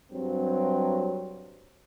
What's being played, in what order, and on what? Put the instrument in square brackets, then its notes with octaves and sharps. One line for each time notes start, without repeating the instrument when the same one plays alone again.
[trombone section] G2 F#3 C4